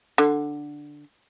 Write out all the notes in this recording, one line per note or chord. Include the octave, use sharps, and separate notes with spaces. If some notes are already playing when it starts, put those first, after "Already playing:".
D3